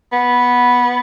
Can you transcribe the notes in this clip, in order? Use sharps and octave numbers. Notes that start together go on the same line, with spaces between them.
B3